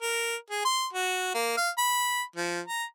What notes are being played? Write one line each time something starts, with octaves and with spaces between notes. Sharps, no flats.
A#4
G#4
C6
F#4
A#3
F5
B5
F3
A#5